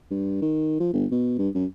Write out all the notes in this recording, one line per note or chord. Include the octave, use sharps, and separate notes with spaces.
G2
D#3
F3
G1
B2
G2
F#2